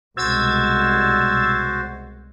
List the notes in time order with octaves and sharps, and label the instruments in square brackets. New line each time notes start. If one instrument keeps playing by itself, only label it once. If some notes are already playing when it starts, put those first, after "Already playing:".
[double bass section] C2 B2 G#3 [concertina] F#4 C5 [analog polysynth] E6 G#6 A6